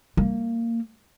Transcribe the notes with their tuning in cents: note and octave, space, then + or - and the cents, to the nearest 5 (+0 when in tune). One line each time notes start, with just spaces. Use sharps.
A#3 -15